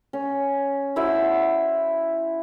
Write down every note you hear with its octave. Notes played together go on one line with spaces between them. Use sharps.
C#4
E4 F#4 C5 E5